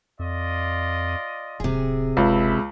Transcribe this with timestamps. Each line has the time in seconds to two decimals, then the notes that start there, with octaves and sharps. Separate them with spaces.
0.19 F2 F4 D5 D#5
1.60 D1 C3 G#4
2.17 F#1 C#2 A4 E5 B5